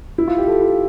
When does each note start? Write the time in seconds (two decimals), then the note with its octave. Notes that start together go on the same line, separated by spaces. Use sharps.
0.18 E4
0.28 F4
0.38 G4
0.47 A4
0.62 F4